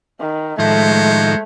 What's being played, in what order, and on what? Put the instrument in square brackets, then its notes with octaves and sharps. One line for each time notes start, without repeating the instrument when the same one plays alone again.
[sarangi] D#3
[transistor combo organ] A2 D#3 F3 [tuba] G#3 [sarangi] A3 [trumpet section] F#4 C5 C#5